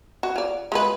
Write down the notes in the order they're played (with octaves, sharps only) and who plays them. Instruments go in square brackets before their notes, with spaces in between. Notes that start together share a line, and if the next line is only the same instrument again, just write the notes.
[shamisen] F#4
F4 D5
G#3 F4 B4